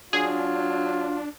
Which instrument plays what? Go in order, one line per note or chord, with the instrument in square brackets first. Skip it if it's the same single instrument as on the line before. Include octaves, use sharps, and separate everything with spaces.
[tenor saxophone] F#3 [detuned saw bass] D4 [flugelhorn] F4 [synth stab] G#4